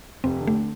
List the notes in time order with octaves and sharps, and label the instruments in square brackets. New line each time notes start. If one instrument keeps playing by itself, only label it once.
[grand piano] F1 [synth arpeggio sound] C4
[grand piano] D3
[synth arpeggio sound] A3